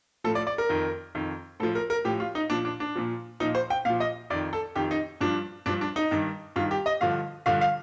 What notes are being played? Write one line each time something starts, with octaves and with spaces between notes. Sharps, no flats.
A2 F3 A4
D5
D5
A#4
F2 D#3
F2 D#3
A2 F3 A4
A#4
A#4
A2 F3 G4
F4
D#4
A#2 F3 D4
D4
D4
A#2 F3
A#2 F3 D#4
C5
G5
A#2 F3 F5
D#5
F2 D#3 D5
A4
F2 D#3 G4
D#4
G2 F3 D4
G2 F3 D4
D4
D#4
G2 D#3
G2 D#3 F4
G4
D#5
G2 D3 F3 F5
G2 D3 F3 F5
F5